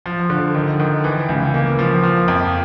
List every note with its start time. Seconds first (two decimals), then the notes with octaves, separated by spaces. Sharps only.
0.06 F3
0.30 D3
0.55 D#3
0.80 D#3
1.04 E3
1.29 C#2
1.54 A#3
1.79 F3
2.03 F3
2.28 F2